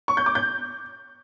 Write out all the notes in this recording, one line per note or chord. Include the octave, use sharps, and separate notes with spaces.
C#6
G6
D6
G6